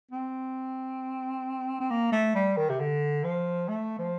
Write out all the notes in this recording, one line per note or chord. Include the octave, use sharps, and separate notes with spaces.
C4
C4
A#3
A3
G3
D#3
C3
D3
F3
A3
F3